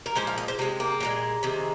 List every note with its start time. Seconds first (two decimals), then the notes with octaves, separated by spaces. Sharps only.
0.06 A#4
0.15 A#2 F3 G#3 C5
0.27 F5
0.38 D#5
0.48 C5
0.59 C3 C4
0.62 G#3
0.80 A#3
1.00 A#2 F3 G#3
1.43 C3 D#3 G#3